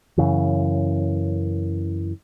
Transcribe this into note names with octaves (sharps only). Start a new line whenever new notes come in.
F#2 C#3 E3